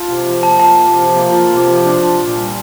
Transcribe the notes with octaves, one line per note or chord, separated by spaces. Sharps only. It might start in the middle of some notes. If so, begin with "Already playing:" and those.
Already playing: F4 A5
C3
F3
A#3 A5
F4 A5
C3
F3
A#3
F4
C3
F3
D4
F4
A#2
G3